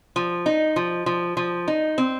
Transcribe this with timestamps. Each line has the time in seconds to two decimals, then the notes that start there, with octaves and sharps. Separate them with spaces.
0.16 F3
0.46 D#4
0.76 F3
1.06 F3
1.37 F3
1.68 D#4
1.98 C4